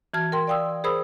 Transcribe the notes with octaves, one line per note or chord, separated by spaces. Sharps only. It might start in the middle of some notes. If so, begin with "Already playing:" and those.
E3 F#4 A5 F6 G#6
A#4 G5 C6
D5 F5 G5 D#6 E6
G#4 A#4 C5 B5 D#6 E6